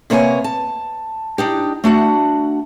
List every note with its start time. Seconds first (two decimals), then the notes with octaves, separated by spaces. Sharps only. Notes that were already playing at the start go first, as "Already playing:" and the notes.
0.10 C3 A#3 B3 C#5 D5 G#5
0.44 A5
1.38 D4 D#4 G4
1.84 A3 D4 F#4 F#5